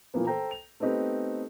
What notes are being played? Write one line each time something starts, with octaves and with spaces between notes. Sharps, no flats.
A#2 E3 F3 A#3 B3
A4 C5 G5 A#5
F7
A3 B3 C4 D#4 G4 B4